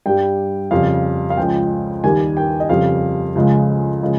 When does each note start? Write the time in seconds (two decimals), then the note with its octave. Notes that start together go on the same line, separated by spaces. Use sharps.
0.06 G2 G3 G5
0.71 F2 C#3 G3 F5
1.30 F5
1.37 C#2 C#3 F3 G#3 G5
2.04 D#2 D#3 G3 G#5
2.37 G5
2.60 D#5
2.69 F2 C#3 G3 F5
3.35 C#2 C#3 F3 G#3
4.03 C#3 F3 G#3